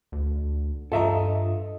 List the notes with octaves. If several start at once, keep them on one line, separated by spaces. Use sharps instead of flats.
D2
G2 F4 A4 D#5 E5 A#5